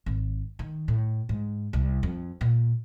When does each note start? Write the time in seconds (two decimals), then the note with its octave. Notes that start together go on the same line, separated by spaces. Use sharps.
0.06 G#1
0.59 D#3
0.88 A2
1.29 G#2
1.73 C2
2.03 F2
2.41 A#2